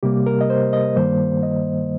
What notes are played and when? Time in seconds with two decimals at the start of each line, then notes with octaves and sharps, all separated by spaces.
0.03 C3 G3 A#3 G4
0.26 A#4
0.41 D#5
0.50 C5
0.73 D#5
0.96 G2 D#3 G3 A#3 C5
1.43 D#5